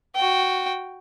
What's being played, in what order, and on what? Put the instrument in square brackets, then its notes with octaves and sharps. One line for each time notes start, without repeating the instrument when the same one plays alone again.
[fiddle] F#4 G5